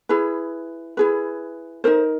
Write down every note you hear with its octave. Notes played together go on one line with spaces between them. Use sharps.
E4 G#4 B4
E4 G#4 B4
D#4 G4 A#4 C5